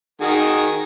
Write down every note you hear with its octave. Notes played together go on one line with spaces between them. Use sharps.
D#3 F#4 G#4